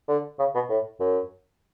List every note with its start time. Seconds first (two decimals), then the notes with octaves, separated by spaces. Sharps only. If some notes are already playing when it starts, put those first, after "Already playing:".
0.08 D3
0.39 C#3
0.55 B2
0.70 A2
1.00 F#2